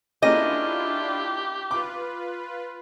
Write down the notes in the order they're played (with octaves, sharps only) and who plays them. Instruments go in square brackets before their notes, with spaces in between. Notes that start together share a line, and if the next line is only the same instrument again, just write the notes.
[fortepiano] A#3 C#4 G#4 [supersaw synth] D4 E4 F4 [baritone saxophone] G4 [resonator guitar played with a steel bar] D#5
[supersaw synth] F4 B4 [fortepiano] D6